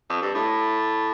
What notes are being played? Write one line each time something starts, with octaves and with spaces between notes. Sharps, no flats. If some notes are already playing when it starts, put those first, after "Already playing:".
F2
G2
A2